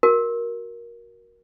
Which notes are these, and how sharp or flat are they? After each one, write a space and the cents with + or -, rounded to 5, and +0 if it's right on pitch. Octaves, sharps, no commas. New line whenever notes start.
F#4 +0 A#4 +10